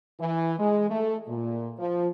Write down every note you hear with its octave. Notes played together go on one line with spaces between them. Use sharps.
E3
G#3
A3
A#2
F3